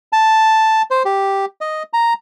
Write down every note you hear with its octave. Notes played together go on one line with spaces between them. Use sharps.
A5
C5
G4
D#5
A#5